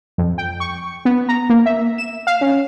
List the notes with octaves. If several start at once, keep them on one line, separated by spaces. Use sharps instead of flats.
F2
G5
C#6
B3
A#5
A#3
E5
E7
F5
C#4